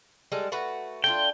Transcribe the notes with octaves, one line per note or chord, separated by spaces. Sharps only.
G3 G#3 A4
A3 F#4 B4
A3 D4 F4 G5